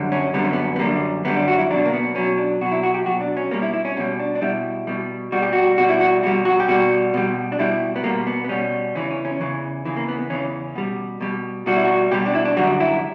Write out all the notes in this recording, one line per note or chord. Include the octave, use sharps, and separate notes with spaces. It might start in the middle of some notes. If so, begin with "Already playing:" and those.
Already playing: F#2 D3 G3
C#4
F#2 D3 G3 B3
C#4
B3
B3
F#2 D3 G3 A#3
F#2 D3 G3 B3
D4
F#4
E4
B2 F#3 D4
A#3
B3
B2 F#3 C#4
D4
B2 F#3 F#4
E4
F#4
G4
B2 F#3 F#4
D4
C#4
B2 G3 A#3
E4
E4
C#4
B2 G3 C#4
D4
D4
B2 G3 E4
B2 G3
B2 G3 F#4
G4
F#4
B2 G3 F#4
E4
F#4
B2 G3 F#4
F#4
G4
B2 G3 F#4
B2 G3
D4
B2 G3 E4
B3
B2 G3 A#3
B3
B3
B2 G3 C#4
E2 C#3 E3 C#4
C#4
C#4
E2 C#3 E3
E2 C#3 E3
A#3
B3
B3
E2 C#3 E3 C#4
B2 G3
B2 G3
B2 G3 F#4
E4
F#4
B2 G3 G4
D4
E4
D4
F#2 D3 G3 F#4
E4